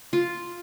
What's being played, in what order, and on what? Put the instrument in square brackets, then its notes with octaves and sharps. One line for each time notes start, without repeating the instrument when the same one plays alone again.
[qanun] F4